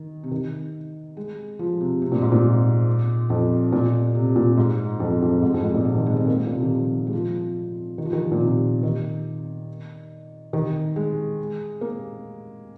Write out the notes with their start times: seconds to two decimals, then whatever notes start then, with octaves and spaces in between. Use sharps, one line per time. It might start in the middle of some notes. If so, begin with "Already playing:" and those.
Already playing: D#3
0.23 C3
0.31 D#3
1.17 G#3
1.59 F3
1.81 C3
2.02 C3
2.12 A#2
2.22 G#2
2.32 A#2
3.30 F2
3.72 A#2
4.15 C3
4.36 A#2
4.57 G#2
5.00 F2
5.22 F2
5.43 G#2
5.54 F2
5.64 G#2
5.75 A#2
5.85 C3
5.96 D#3
6.06 G#3
6.17 C4
6.28 A#3
6.47 A#2
6.55 C3
6.63 D#3
6.70 F3
7.07 G#3
7.13 F3
7.98 D#3
8.05 F3
8.13 D#3
8.32 A#2
8.41 C3
8.83 D#3
10.53 D#3
10.96 G#3
11.81 A#3